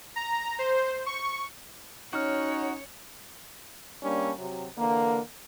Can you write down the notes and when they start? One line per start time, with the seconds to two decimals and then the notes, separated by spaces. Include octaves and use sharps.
0.16 A#5
0.59 C5
1.06 C#6
2.13 C#4 D#4 F#4 C#5 F#5 F6
4.03 G3 A#3 C#4 D4
4.39 C3 F#3
4.77 D3 E3 A#3